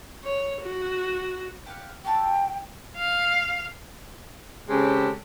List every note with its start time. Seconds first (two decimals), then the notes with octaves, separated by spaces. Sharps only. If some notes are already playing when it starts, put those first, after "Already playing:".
0.23 C#5
0.61 F#4
1.66 G4 F5 F#5
2.05 F#4 G5 A5 E6
2.97 F5
4.69 C#3 G#3 C4 C#4 G4 A4